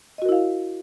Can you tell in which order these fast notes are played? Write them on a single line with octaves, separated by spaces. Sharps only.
D#5 F#4 A#4 E4 F5